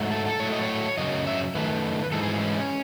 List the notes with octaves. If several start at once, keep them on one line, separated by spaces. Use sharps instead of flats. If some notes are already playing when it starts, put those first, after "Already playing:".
Already playing: G#2 F#3 A3
A4
A4
A2 F#3 A3 C#5
D#5
C#5
F#2 C#3 F#3 D#5
E5
F#2 D#3 A3 B4
G#2 E3 G#3 A4
G#4
C#4